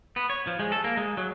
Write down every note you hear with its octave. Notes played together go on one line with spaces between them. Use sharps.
B3
C#5
F3
G#3
A4
A#3
G#3
F#3